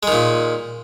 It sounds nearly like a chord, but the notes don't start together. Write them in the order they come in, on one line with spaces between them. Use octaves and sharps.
G#3 D#3 A#2